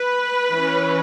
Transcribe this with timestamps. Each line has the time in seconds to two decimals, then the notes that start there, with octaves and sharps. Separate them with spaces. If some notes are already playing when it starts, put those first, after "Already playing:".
Already playing: B4
0.52 E3 C#4